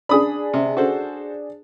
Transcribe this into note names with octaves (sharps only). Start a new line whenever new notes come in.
D4 G#4 B5 D#6
C3
F#4 A4 C5